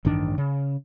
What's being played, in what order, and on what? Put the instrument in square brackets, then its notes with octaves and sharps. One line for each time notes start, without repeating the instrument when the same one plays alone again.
[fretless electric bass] A1 G2 D#3 D4
C#3